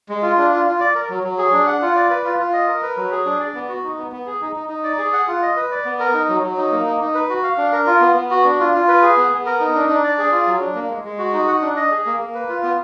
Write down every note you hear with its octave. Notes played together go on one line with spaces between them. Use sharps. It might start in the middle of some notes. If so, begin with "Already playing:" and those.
G#3
F4
D4
F4
F4
D5
A#4
F#3
F#3
G#4
D4
F#5
F4
D5
B4
F4
F4
D#5
A#4
B4
F#3
G#4
D4
D5
B3
F#4
D#4
B3
B3
G#4
D#4
D#4
D#4
D5
G#4
F#5
F4
D#5
B4
D5
B3
A#4
D#4
F#3
F#3
D#4
A#3
D#4
D#4
B4
F#4
F5
D4
A#4
F4
B3
B3
F#4
D4
F4
F4
B4
G#4
B3
B3
A#4
D#4
D4
D4
D5
G#4
F4
F#3
D4
A#3
G#3
G#3
F#4
D#4
F#5
D4
D#5
G#4
A#3
A#3
B4
F4
B3